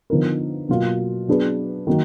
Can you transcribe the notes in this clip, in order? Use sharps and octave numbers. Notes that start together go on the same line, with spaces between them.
D3 F3 B3 D#4 A#4
B2 F#3 A#3 F4
F#3 B3 D4 G#4 B4
D#3 F#3 A#3